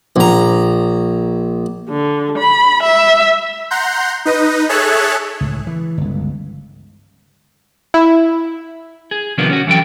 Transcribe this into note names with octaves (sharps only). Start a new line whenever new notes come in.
A#1 A#5
D3
B5
E5
F#5 A#5 C6 G6
D#4 B4 D#5
G#4 A4 C#5 E5 A5 F#6
C#2 A2
E3
G1 C#2
E4
G#4
C3 D#3 F3 A#3 B3 D4
C#4 F#4
E3 F#3 F#4 A4 G5